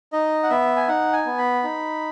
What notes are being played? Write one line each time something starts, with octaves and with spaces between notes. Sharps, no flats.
D#4 D#5
F#5
B3 E5
G#5
D#4 F#5
G#5
B3
B5
D#4